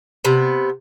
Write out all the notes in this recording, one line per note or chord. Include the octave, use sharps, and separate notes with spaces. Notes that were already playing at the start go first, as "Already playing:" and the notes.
C3 B3